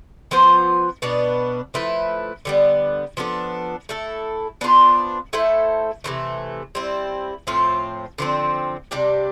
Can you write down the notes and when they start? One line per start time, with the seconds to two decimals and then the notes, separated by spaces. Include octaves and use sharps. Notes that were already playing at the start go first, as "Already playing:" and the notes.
0.31 F3 B3 F4 C5
1.02 B2 B3 D4
1.74 F3 A3 E4 B4
2.45 D3 G3 B3
3.17 F3 B3 D4 A4
3.89 A3 E4 A4
4.61 B3 D4 F4 C5
5.33 A3 E4 A4 C5
6.04 C3 E3 A3
6.75 G3 C4 E4
7.47 A2 F3 C4 F4
8.18 D3 F3 C4
8.91 C3 G3 D4 G4